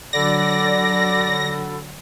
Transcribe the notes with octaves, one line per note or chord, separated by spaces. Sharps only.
D3 F#3 A4 D5 F#5 B5 A#6